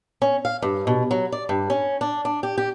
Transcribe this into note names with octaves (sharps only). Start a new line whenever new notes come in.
C#4
F5
G2
B2
F#3
D5
G2
C#4
D4
D4
G4
G4